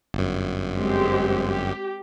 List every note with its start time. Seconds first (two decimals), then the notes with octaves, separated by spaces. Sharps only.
0.14 G1 F#2
0.76 G#3 C4 G4
1.48 G4